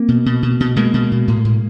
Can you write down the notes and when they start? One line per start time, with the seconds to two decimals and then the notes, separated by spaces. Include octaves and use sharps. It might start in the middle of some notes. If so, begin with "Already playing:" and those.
Already playing: A#3 C4
0.08 B2
0.26 B2
0.43 B2
0.60 B2
0.76 B2 G#3 A#3
0.94 B2
1.12 B2
1.28 A2
1.45 A2